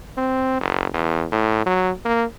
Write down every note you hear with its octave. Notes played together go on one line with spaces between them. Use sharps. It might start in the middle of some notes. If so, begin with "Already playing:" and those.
C4
F#1
E2
A2
F#3
A#3